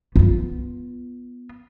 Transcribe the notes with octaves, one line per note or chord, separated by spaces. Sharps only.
B3 F4